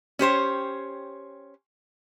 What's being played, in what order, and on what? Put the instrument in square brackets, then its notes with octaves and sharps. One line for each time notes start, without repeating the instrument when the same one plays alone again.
[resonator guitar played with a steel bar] C#4 G4 C5 C#5